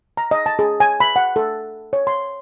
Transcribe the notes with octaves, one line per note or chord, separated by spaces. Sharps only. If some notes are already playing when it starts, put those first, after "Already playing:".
A#5
D#5
A5
G#4
G#5
B5
F#5
A4
C#5
C6